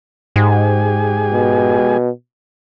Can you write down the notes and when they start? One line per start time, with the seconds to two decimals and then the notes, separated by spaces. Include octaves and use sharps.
0.36 G#2 G#3 G4 G#5
1.33 B2